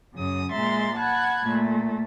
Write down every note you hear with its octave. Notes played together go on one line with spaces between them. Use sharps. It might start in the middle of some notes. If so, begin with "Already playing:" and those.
F#2 C#3 D#6
A#2 G#3 E5 A#5 C6 A6
F#5 A5 B5 F#6 G#6
A#2 A3